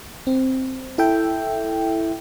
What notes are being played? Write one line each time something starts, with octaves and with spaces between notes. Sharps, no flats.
C4
E4 A4 E5 G5